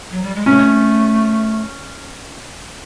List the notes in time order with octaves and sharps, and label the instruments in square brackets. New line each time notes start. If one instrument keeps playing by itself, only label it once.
[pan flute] F#3
G3
G#3
[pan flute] A3 [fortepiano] C#4